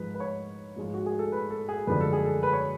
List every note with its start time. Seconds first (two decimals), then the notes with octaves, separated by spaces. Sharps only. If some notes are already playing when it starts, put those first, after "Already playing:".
Already playing: G#2 F3 G#3 B4
0.14 B4
0.20 C#5
0.76 G#2 F3 G#3 F4
0.94 F#4
1.06 G#4
1.19 A4
1.32 B4
1.51 A4
1.69 G#4
1.87 F#2 D3 F3 G#3 B4
2.00 A4
2.13 G#4
2.26 A4
2.43 B4
2.53 C#5